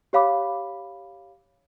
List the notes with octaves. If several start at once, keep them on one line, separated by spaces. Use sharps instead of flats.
G4 C#5 F5 B5 D6